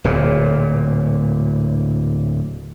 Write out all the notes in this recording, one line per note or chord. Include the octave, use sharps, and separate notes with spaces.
D1 A#2